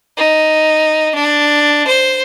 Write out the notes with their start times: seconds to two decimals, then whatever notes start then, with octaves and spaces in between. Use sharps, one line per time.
0.17 D#4
1.15 D4
1.87 C5